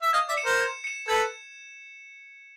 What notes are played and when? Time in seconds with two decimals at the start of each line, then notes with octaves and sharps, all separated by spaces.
0.02 E5
0.13 D#5 F5 G#6
0.28 D5 E5
0.37 C#7 E7
0.45 A#4 C5
0.61 G#6
0.84 C#7 E7
1.08 A4 B4 G#6